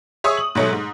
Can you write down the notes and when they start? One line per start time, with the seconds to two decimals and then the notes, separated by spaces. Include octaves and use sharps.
0.24 G#4 C#5 E5 C#6 D#6
0.37 F#7
0.55 G#2 B2 F#3 A3
0.73 G#2